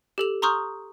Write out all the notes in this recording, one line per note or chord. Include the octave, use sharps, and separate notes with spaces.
G4 A4 F7
A#5 C6 C#6 D#6 F6 G6